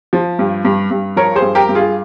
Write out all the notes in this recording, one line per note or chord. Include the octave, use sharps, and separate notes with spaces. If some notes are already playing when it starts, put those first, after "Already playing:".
F3
G2
G2
G2
F3 A#4 C#5
G#4 C5
G2
G4 A#4
G2
F4 G#4